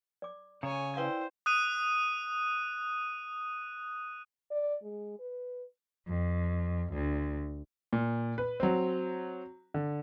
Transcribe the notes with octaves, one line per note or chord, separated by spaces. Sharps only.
D5 D6
C#3 C#5 G#5 A#5
E4 B4 C5 D5 F5 G5
D#6 F#6 D#7
D5
G#3
B4
F2
D2
A#2
B4
F#3 C4
D3